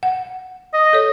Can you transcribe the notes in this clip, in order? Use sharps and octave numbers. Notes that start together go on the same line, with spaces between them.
F#5
D#5
A4 C#5